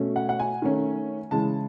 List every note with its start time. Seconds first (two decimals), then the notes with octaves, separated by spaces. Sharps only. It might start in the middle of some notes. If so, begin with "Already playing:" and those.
Already playing: B2 A3 C#4
0.16 F#5
0.29 F#5
0.40 G#5
0.62 D#3 A3 C#4
1.31 C#3 E3 G#3 A5